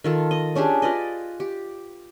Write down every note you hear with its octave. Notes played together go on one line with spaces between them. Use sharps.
D#3 F4 A4
D#5
C#4 D4 G4 G#4
F4 B4 D5 D#5
G4